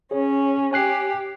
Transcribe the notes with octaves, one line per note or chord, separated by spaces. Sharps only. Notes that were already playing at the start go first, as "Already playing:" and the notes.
C#4 G#4 C#5
G4 G#5 F#6 C7